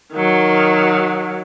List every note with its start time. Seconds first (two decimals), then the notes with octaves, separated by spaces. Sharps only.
0.12 D#3 F#3